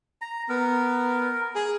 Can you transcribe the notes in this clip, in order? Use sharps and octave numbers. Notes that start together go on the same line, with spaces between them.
A#5
B3 A#4
G#4